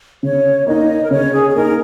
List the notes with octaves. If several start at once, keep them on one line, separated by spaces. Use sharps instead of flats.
C#3 C#5
A#3 D#4 D#5
A#4
C#3 C#5
G#4
G#4
A#3 D#4 A#4